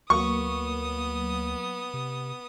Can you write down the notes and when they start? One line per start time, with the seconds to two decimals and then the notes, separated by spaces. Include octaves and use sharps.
0.10 D2 F#3 A#3 B3 C#6 D#6
1.94 C3